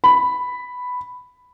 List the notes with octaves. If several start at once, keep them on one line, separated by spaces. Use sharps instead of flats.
B5